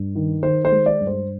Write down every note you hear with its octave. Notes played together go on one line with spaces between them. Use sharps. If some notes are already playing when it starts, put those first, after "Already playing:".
Already playing: G2
D#3
D#3 C5
C5
G#3
D5
G2
C5